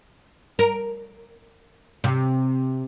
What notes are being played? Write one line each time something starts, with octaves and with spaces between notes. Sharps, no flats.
A#4
C3